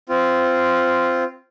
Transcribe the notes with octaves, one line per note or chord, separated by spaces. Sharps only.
C4 F4